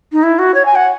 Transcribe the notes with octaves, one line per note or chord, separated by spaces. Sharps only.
D#4
E4
F#4
C#5
G#5
F#5